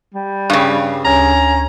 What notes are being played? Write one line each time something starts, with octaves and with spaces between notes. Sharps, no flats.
G3
G2 C#3
D2 C#4 A#5